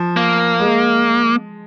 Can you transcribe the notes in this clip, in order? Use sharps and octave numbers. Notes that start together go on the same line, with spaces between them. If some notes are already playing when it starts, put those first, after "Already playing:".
Already playing: F3
A#3
G#3